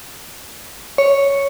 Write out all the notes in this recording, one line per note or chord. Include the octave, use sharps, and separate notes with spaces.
C#5